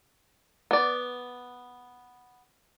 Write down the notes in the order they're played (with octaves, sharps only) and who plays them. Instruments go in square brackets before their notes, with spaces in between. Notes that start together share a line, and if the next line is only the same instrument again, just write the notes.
[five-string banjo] B3 D5